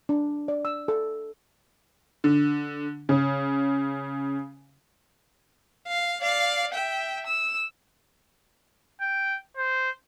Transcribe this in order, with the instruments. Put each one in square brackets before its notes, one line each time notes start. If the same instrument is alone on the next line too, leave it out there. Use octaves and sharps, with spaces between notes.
[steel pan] D4
D5
E6
A4
[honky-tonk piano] D3
C#3
[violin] F5
D5 F5
E5 G5
E6
[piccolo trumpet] G5
C5